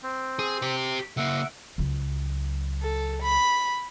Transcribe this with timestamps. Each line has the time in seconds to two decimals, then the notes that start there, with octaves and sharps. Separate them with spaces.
0.03 C4
0.39 G#4
0.62 G4 C5
1.17 C#3 A#3 E5 F#5
1.78 C#2 F#3
2.82 A4
3.23 B5